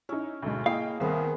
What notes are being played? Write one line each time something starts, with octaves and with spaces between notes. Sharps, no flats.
C#4 D#4 E4
D2 G#2 B2
A#3 E4 G#4 D#5 F5 G5
C2 D#3 B3 G#4 C5